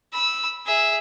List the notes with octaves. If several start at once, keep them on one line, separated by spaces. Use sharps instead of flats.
B5 E6
G#4 E5